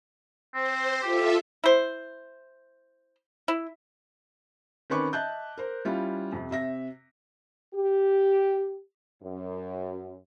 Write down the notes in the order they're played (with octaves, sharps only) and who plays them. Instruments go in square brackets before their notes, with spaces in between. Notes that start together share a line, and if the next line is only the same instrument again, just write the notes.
[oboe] C4 [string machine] C5
[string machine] F4 A4 E5 [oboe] G4
[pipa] E4 C5
E4
[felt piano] D#3 C4 C#4 B4 C#6 D6
D#5 E5 A5 F#6 G6
A#4 C5
G3 C#4 E4 F4
F2 C3
C3 E5 A#6
[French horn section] G4
F#2